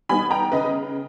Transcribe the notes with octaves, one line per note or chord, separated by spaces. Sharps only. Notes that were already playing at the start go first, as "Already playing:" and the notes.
G3 B3 D#4 G#5 B5
G5 A#5
C#3 B4 D#5